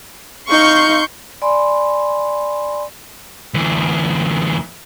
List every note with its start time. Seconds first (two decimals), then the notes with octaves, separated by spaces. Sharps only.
0.49 D#4 F5 C6 C#6 G6
1.42 D5 G#5 B5 C6
3.54 D2 E3